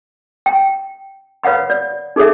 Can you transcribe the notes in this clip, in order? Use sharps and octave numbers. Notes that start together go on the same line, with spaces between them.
G5
B4 C#5 F5 F#5 B5
D5
D#4 G#4 A4 C#5 E5